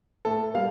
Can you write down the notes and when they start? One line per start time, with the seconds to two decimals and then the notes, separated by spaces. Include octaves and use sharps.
0.25 A2 A4
0.54 G3 A#3 F5